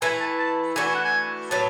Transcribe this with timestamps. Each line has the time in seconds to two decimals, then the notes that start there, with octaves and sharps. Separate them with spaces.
0.02 E3 A3 E4 G#5
0.20 A5
0.39 A5
0.76 E3 A3 D4 F#4 G#5
0.86 G#5
0.95 F#5
1.05 G#5
1.51 A2 F#3 B3 A5